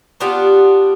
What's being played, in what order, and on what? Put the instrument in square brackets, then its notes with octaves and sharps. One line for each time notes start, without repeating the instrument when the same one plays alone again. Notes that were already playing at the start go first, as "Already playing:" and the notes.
[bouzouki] B3 D4 F4 G4